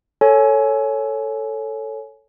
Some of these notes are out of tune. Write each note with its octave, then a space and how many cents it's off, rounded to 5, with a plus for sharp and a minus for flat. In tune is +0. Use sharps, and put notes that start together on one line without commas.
A4 +5 C#5 +0 G#5 +20